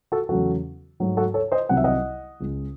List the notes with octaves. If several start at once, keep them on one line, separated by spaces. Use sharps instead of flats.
F#4 A4
E2 C#3 F#3 A3 F#4 A4
G#2 F#3 A3
F#4 A4
A4 C#5
C5 D#5
C2 C3 D#3 F#3 F#5
E5
D#5 F#5
C#2 C#3 G#3